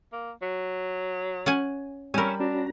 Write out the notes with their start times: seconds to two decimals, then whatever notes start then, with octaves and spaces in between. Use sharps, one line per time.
0.12 A#3
0.42 F#3
1.46 C#4 F#5 G#5
2.14 G3 C#4 A#4 G#5 B5 C#6 E6
2.40 C#4 D4 F#4 A#5